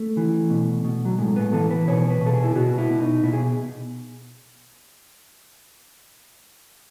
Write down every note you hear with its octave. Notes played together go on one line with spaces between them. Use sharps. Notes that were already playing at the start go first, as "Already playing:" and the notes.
Already playing: A3
E3
B2
B2
F#3
A2 G#3
B3
E3 A4
B4
B2 C#5
B4
B2
A4
G#4
E4
B2 F#4
E4
B2
D#4
B2 E4
G#4